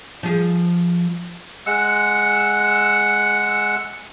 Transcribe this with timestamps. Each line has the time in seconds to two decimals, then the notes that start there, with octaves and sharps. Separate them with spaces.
0.23 F3 G#4
1.66 G#3 F#5 E6